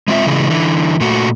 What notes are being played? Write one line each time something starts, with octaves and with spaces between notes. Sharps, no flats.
G#3 C4 F4 E5
C#3 E3 G#3 C#4
D3 E3
A#2 A3 F#4